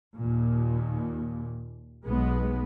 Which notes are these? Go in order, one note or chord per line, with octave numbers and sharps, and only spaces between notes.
D#2 A#2
B1 G#3 B3